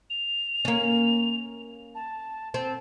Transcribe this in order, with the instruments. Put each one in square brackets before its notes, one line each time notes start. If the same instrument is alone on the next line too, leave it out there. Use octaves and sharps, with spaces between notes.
[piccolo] F7
[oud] A#3 C#4
[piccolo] A5
[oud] C4 [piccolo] A5